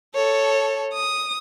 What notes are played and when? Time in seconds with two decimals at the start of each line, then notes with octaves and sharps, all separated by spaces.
0.15 A4 C#5
0.94 D#6